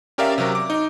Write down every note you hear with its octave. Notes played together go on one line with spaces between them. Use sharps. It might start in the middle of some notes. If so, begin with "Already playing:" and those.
C#4 G4 A#4 D5 E5 F5
C3 F#3 A#4
D6
D#4